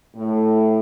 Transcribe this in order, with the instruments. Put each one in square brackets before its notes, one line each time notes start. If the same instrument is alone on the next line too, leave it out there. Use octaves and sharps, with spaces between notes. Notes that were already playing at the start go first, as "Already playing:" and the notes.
[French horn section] A2